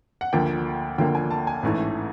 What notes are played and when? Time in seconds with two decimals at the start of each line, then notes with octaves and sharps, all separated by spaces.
0.21 F#5
0.33 D2 D3 F3 A#3 G5
0.98 D2 D3 F3 A#3 G5
1.15 G#5
1.31 A5
1.47 G#5
1.63 A1 G#2 E3 A3